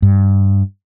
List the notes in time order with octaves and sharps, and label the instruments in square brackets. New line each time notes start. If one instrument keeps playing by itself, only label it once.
[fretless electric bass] G2